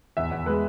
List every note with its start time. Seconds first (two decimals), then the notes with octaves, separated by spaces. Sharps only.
0.17 E2 E5
0.32 E2
0.46 G#3 B4